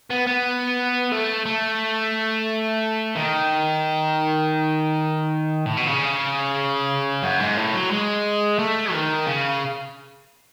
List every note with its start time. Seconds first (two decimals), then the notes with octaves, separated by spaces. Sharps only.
0.10 B3
0.27 B3
1.12 A3
1.46 A3
3.15 D#3
5.66 A2
5.77 B2
5.87 C#3
7.23 F#2
7.40 G#2
7.57 A2
7.74 F#3
7.91 G#3
8.59 A3
8.93 D#3
9.27 C#3